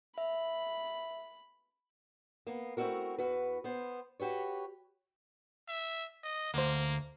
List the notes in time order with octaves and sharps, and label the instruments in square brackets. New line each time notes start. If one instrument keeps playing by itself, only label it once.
[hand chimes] E5 [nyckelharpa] B5
[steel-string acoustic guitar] A#3 B3
A3 C4 D4 E4 F#4 A#4
E2 F#4 B4
B3 C5
F#4 G4 B4 C#5
[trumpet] E5
D#5
[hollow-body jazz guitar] D2 C5 [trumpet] A#3